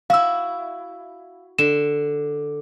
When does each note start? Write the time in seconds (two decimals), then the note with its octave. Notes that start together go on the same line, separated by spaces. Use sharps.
0.10 E4 F#4 F5 E6
1.59 D3 E7